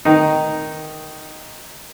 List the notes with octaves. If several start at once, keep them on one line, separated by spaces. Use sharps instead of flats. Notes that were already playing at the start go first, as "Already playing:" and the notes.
D#3 D#4